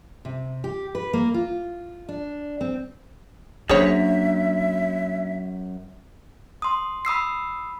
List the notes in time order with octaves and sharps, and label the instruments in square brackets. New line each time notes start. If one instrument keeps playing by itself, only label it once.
[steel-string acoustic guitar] C3
G4
B4
A#3
F4
D4
C4
[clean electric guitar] F#2 [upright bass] A#3 D4 [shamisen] G#4 C5 C#5 [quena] E5
[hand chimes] C6 D#6
B5 D#6 E6 C7